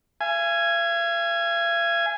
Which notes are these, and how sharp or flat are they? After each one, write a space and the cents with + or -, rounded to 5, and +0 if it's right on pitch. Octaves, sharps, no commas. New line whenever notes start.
F5 -45 G#5 +0